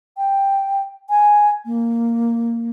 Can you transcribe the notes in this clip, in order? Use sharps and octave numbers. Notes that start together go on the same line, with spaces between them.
G5
G#5
A#3